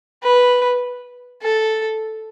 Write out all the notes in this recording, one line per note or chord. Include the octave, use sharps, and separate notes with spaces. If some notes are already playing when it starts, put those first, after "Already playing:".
B4
A4